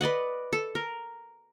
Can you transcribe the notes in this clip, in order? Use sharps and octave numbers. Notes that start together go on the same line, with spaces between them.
B4 D5 D#5 F#5
A4
A#4